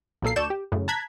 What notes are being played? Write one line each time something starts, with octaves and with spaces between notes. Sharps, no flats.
B1 A#2 A#3 A4 C7
D2 A4 D5 C#6 G6 E7
G4
F#2 A2 C#3
A5 A#5 F#6 G#6 B6